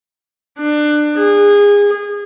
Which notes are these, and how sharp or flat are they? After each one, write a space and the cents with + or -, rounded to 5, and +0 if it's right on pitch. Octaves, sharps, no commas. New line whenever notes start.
D4 +25
G#4 -25